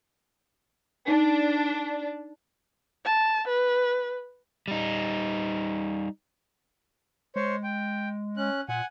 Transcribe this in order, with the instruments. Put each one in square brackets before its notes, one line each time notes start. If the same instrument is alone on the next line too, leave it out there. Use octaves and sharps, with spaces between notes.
[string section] D4 [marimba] D#4
[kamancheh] A5
B4
[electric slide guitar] G3 D#4
[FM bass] G#3 [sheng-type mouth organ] C5 C#5
[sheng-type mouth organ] G5
C#4 F#6
[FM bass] A#2 [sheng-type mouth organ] F#5 G#5